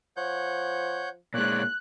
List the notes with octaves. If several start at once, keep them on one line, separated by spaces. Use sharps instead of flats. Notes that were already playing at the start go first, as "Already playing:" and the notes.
F3 C#5 F#5 G6
A#2 G#3 C#5 D5 F#6